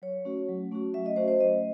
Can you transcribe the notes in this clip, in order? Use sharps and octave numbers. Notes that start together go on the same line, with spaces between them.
F#3 C#5
A3 C#4 F#4
F#3
A3 C#4 F#4
F#3 E5
D#5
A3 C#4 F#4 C5
C5
F#3 D#5